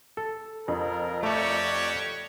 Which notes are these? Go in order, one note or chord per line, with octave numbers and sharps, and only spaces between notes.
A4
F2 A#4
A3 F#4 G4 A4 C#5 D5